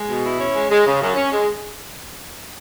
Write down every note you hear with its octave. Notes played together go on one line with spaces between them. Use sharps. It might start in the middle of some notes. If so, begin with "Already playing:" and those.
Already playing: G#3
B2
E4
C#4
G#3
G#3
C#3
F#2
C#4
G#3